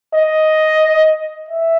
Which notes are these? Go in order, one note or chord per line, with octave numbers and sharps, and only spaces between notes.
D#5
E5